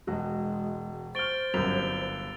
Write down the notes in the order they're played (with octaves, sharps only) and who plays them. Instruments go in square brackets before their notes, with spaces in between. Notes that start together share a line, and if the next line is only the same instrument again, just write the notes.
[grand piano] E1 F#4 [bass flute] G#3
[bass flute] C5 [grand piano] C#6 F6 [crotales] A6 D7 G7
[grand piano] G1 C2 [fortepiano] F#2 [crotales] E6 F7